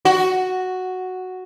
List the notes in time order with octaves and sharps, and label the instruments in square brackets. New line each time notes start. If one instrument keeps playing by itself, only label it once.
[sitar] F#4